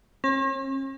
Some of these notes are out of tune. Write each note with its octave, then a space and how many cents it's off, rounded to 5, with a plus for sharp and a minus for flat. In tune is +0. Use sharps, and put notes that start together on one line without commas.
C#4 -45